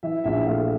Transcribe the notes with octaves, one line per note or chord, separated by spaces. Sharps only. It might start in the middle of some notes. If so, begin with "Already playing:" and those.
E3 E5
A#1 E5
A3 F5